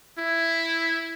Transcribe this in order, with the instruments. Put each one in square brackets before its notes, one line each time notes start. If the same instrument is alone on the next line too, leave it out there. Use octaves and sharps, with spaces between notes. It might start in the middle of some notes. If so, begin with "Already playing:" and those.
[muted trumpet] E4